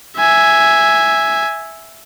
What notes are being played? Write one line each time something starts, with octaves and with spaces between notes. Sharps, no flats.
E5 G#5